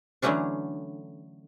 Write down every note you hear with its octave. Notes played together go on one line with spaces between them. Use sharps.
D3 E3 F#3 A3 C#4 D4